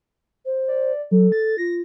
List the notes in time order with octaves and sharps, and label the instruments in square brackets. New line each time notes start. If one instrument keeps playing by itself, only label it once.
[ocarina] C5
[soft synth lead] D5
[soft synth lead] F#3 [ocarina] A4
[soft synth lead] A6
[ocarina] F4 [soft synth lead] A#6